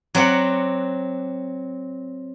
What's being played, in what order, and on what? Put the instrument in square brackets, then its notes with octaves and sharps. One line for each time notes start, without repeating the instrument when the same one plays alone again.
[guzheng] F#3 C4 D5 F#5